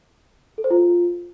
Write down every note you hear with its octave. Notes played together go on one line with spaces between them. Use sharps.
A4
C5
F4